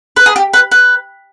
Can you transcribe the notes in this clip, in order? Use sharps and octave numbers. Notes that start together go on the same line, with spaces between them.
B4
G#4
G4
B4
B4